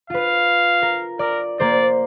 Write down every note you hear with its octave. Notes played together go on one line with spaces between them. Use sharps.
F4 B4 F5
A#4
A#4 D5
A#3 A#4 C5 D5